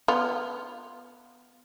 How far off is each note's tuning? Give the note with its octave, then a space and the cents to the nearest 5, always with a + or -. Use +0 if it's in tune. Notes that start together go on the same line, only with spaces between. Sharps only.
B3 +5 F4 +0